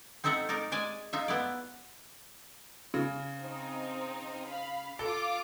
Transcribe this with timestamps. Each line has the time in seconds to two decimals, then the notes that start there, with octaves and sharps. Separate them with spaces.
0.24 C4 D#4 A4 E5 F#5
0.49 D#4 A#4 D5
0.72 G#3 D5 G#5
1.13 D#4 F4 E5
1.28 B3 E4 D5
2.94 C#3
3.40 C4 D#4
4.49 F5 B5
4.99 F4 A4 D6